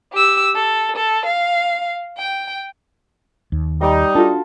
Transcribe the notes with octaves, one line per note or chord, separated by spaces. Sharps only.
G4 E6
A4
A4
F5
G5
D#2
G3 D#4 D#5 G5
D4 F4 F#4 A4